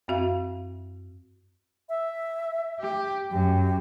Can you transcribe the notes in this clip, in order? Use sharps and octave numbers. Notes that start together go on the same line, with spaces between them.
F#2 C4 F#4 E5 F5
E5
G4
F#2 G4